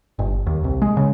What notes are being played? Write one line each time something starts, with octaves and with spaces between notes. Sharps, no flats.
G1
D#2
C2
G#3
C#3